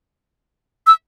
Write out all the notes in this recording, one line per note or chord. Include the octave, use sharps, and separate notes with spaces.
E6